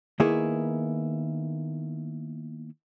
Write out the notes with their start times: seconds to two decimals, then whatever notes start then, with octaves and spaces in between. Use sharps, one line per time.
0.20 D#3 A#3 B3 E4 G#4